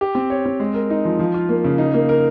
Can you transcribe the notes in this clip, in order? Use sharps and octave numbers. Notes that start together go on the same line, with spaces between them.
G4
C4
C#5
C4
G#3
A#4
D#4
F3
F3
F4
A#3
C#3
D#4
A#3
A#4